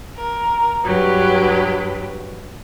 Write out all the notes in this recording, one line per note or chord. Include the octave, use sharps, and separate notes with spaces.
A#4
G2 F#3 G4 B4